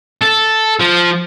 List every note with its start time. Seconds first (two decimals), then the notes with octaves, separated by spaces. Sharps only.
0.21 A4
0.80 F3